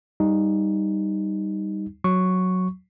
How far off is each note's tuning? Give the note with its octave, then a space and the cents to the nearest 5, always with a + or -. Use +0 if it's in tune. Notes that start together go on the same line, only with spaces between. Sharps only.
G3 +0 D#4 +0
F#3 -5 C#6 +0